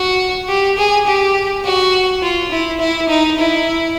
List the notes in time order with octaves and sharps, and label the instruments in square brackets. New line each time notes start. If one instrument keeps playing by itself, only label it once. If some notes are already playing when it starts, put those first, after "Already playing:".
Already playing: [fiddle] F#4
G4
G#4
G4
F#4
F4
E4
E4
D#4
E4